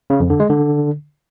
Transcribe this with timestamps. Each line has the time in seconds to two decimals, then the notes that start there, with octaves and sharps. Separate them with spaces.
0.10 C#3
0.20 F2
0.30 D3
0.40 G#3
0.50 D3